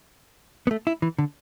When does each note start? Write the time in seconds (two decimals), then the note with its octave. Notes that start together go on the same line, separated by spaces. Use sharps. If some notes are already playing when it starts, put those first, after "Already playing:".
0.67 B3
0.71 A3
0.87 E4
1.02 E3
1.19 D3